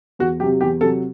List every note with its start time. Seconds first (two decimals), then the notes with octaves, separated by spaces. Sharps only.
0.19 E2 F#4
0.40 C3 F#3 G4
0.61 E2 G4
0.81 C3 F#3 A4